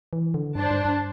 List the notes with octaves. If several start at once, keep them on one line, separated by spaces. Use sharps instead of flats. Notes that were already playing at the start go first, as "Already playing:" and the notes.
E3
D3
G2 D4 C5 A5
G2
G2